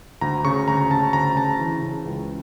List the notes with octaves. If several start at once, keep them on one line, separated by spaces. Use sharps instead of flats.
D2 A#5
C#3 C#6
D2 A#5
C#3 A5
D2 A#5
C#3 A5
E3
C#3
C#2